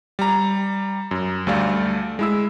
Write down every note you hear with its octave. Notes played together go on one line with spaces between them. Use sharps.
G3 A#5
F#2
D2 G3 A3 A4 D5 F5
G#3 E4 E6